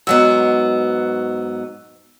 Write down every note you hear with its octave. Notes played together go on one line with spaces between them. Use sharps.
G#2 F#3 B3 D#5 E6